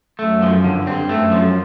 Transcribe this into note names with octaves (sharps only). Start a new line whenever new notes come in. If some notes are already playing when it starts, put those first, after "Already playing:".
F#2 A3
F3
G2 D3
C4
F#2 A3
F3